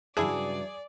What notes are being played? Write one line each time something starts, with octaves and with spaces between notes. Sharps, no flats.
G2 C#3 F#3 D4 E4 G#4 D5